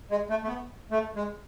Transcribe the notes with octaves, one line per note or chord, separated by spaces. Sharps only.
G#3
A3
A3
B3
A3
G#3